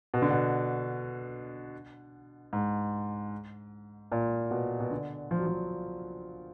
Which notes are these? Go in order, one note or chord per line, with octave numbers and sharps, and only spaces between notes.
B2
D3
B2
G#2
A#2
B2
B2
D3
F3
F#3
F3